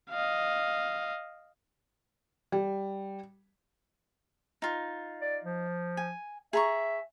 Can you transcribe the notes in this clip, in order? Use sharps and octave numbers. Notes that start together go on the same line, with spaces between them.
D#5 F5
G3
D#4 F4
D5
F3
G#5
G#4 E5 A#5 C#6